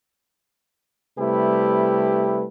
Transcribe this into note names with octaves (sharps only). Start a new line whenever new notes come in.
C3 G3 A3 E4 G4 B4